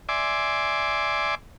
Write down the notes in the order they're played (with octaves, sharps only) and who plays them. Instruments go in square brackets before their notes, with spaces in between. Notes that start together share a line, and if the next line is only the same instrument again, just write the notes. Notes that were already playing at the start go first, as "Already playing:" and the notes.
[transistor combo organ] D5 E5 G#5 C6 D6